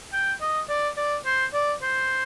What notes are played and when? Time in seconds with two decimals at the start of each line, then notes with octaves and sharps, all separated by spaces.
0.13 G5
0.41 D#5
0.69 D5
0.97 D5
1.26 C5
1.54 D5
1.82 C5